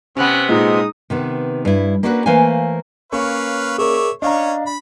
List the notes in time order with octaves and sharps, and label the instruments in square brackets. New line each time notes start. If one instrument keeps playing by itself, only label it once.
[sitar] C3 B3 [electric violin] C#4 F#6
[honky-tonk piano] A#2 [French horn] G#3 [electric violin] D#4 D#6
[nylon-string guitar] C3 D#3 B3
G2 E4
A#3 C#4 D4 F#4 A#4 B4
E3 A3 A#3 C5 F5 G#5
[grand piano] A#3 C#4 C#6 [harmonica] B4 C#5 F5
[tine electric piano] G#4 A#4 [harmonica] C#5 D5 E5
[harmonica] C#4 C#5 [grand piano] D4 [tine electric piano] D#5 F5 A#5
[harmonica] B5